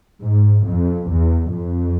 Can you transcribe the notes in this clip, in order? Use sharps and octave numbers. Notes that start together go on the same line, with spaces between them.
G#2
F2
E2
F2